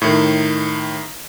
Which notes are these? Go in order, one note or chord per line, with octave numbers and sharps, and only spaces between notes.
A2 D#3